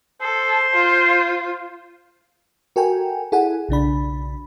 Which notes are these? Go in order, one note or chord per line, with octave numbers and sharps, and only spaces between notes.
A4 C5
F4
F#4 A4 A#4 G5 G#5
E4 G#4 A4 F#5 G#5
B1 C#3 D4 B5